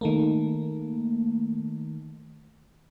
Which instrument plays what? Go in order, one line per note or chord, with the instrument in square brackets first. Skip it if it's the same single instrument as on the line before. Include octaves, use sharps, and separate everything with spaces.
[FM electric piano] D#3 A3 A#3